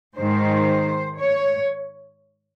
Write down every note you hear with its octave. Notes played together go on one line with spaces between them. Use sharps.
G#2 D#3 G#3 C5
C#5